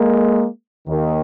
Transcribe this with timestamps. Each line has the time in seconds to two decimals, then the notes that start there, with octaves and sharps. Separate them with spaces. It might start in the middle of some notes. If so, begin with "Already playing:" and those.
Already playing: G#3 A#3
0.87 D#2 D#3